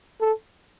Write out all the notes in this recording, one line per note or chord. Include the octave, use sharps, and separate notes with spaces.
A4